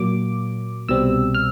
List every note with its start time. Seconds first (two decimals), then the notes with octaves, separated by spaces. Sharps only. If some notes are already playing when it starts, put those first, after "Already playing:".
Already playing: A#2 F#3 A#3 D6
0.89 C2 B2 G3 C4 E6
1.34 F6